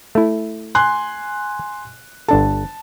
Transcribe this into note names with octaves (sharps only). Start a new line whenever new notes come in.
A3 E4
G#5 C6 F#6
G1 D4 A4 A5